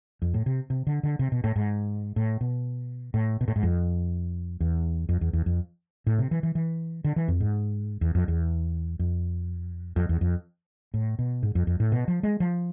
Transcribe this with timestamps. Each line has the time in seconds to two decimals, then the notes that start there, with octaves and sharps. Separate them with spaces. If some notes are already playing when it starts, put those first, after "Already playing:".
0.22 F2
0.34 A2
0.46 C3
0.70 C3
0.87 D3
1.03 D3
1.19 C3
1.32 B2
1.44 A2
1.56 G#2
2.16 A2
2.41 B2
3.14 A2
3.41 B2
3.48 A2
3.56 G#2
3.63 F2
4.60 E2
5.09 F2
5.21 E2
5.33 E2
5.46 F2
6.07 A2
6.19 C3
6.31 E3
6.43 E3
6.55 E3
7.04 D3
7.16 E3
7.28 F2
7.40 G#2
8.01 E2
8.15 F2
8.28 E2
8.99 F2
9.96 F2
10.09 E2
10.21 F2
10.94 A2
11.19 B2
11.43 G#2
11.55 F2
11.67 F2
11.80 A2
11.92 B2
12.08 F3
12.23 G#3
12.40 F3